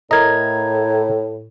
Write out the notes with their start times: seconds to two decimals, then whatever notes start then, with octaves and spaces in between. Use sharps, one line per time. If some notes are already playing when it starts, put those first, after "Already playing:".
0.11 A2 A#4 D#5 A#5 G#6